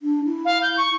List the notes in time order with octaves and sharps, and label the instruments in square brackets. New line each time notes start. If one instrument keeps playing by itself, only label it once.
[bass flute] D4
E4
[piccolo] F5
G6
C#6